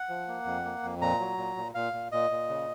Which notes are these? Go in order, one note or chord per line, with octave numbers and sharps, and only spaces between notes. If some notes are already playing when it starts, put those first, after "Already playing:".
Already playing: F#5
F3
A#3
F2
A#3
F2
A#2 A#5
F#3
A#2
A#2
A#2 F5
A#2
A#2 D#5
A#2
C#3